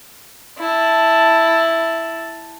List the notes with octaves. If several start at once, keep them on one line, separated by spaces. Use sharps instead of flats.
E4 A5